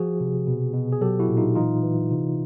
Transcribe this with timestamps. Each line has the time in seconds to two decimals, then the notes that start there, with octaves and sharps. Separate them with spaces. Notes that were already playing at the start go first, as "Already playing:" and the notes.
Already playing: F3 F#4 G#4
0.20 C3
0.47 B2
0.74 B2
0.93 G#4
1.01 F#3 G4 A4
1.19 E4 F#4
1.29 A#2
1.37 D#4 F4
1.55 E3 D#4 F4
1.83 E3
2.10 C3